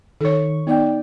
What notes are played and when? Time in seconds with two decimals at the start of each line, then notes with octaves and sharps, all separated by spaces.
0.21 D#3 A4 C#5 C#6
0.67 B3 D#4 D5 G5